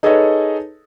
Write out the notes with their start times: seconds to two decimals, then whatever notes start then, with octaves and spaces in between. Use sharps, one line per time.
0.03 D#4 G#4 A4 B4 C#5 D#5